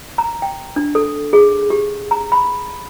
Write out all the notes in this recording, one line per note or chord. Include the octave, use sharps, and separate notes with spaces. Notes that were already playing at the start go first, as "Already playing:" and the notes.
A#5
G5
D4
A4
G#4
G4
A#5
B5